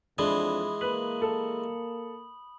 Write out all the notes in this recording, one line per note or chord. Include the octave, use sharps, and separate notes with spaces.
F2 E3 G#3 D4 B5 D#6
A#3 B4 B5 F#7
A4